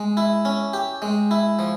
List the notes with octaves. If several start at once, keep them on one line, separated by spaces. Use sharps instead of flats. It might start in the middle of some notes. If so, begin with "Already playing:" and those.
Already playing: G#3
E4
C#4
G4
G#3
E4
F3